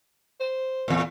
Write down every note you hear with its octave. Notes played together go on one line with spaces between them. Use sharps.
C5
E2 A#2